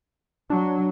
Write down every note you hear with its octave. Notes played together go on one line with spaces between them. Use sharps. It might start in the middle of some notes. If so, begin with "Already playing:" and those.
F#3 D4